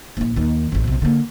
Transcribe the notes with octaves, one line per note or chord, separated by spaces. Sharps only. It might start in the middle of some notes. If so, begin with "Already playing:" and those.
A#1 E4
D#2 D#3
A1 F2
B1 C3
D3 A#3